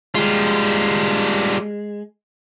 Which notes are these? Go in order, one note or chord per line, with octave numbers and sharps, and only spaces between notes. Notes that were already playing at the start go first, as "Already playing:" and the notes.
G3 G#3 F4